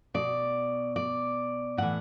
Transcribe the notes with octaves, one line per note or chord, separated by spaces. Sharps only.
B2 D5
D5
A2 E3 F#5